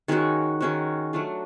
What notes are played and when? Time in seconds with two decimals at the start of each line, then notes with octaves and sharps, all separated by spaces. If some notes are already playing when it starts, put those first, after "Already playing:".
0.08 D#3 G#3 C#4 F#4
0.60 D#3 G#3 C#4 F#4
1.13 F#3 A3 D4 F4